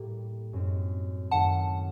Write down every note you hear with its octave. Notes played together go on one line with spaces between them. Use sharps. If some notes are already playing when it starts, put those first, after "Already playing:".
Already playing: A2 G3 A#3
F#2 F#3 C4 D#4
F#2 D#3 A3 D#4 F#5 A5